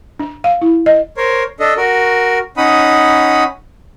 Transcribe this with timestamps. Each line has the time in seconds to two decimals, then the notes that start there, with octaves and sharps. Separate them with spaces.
0.19 D4
0.44 F5
0.62 E4
0.86 D#5
1.17 A#4 C5 C#5
1.60 D4 A4 D#5
1.77 F#4 A#4
2.57 C#4 D#4 F#5 B5 D#6